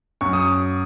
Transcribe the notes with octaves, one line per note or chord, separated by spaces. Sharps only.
F#2 C#6
D#6